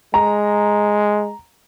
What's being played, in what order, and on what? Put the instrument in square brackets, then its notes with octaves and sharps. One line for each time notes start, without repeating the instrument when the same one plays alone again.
[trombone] G#3 [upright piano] A#5